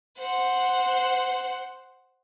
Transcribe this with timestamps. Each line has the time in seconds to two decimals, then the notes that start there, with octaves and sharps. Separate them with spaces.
0.18 C5 F#5